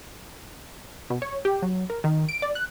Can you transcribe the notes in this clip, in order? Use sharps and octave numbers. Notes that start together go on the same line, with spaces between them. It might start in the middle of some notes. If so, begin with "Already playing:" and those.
B2
C#5
G4
F#3
A#4
D#3
D7
D5
F#6